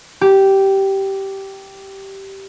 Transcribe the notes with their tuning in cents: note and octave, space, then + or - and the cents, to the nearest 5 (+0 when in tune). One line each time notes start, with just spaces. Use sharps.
G4 -10